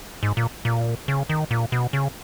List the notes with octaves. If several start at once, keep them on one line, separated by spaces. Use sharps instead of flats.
G#2
A#2
A#2
C#3
D#3
A#2
B2
C#3